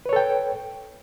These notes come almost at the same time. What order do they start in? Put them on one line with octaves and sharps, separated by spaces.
B4 C#5 A4 G5